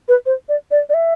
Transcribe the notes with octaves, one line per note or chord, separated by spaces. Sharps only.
B4
C5
D5
D5
D5
E5